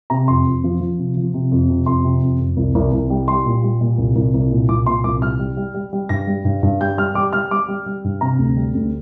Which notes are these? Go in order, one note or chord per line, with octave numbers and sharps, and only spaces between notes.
C3 A#5
F2 C6
F2
F3
F3
C3
F3
C3
F2
C3
F2 C6
C3
F2
F2
C2
C2
C2
G3
G3 C6
A#2
G3
A#2
C2
C2
C2
A#2
C2 D6
A#2 C6
C2 D6
G3 F6
G3
G3
G3
G3
G2 A#6
G3
G2
G2
G3 G6
G3 F6
G3 D6
G3 F6
G3 D6
G3
G3
G2
C3 A#5
D2
G3
D2